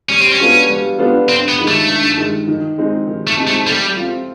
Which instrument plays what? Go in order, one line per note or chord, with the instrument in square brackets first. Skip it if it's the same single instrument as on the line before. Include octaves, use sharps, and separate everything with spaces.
[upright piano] G3 [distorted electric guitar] C#4
[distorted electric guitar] C4
C#4
[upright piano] B3 D4 F4 A4
G3
B3 D4 F4 A4
[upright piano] G2 [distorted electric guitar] C4
[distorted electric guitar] B3
[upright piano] D#3 G#3
[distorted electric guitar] A3
[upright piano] G2
D#3 G#3
D#3
G#3 C4 D#4 G#4
D#3
[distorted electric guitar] A3
[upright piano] G#3 C4 D#4 G#4
[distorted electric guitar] A3
[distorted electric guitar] G3 [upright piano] A3
[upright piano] C4 F4